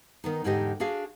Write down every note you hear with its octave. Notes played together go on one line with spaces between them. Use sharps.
D#3 B3 D#4
E2 G#2 D3 D#4 G4 D#5
D4 F#4 G#4 F5